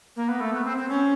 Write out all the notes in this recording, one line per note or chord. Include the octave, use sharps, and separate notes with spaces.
A#3
B3
A3
B3
C4
C4
C#4